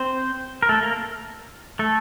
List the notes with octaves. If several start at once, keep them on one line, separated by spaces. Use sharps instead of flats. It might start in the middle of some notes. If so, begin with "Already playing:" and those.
Already playing: C4 C5
A#4
A3 A4
A#3 A#4
A3 A4